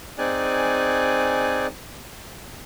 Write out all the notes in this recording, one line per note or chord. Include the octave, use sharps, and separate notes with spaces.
C4 D#4 G#4 D5 G#5 F#6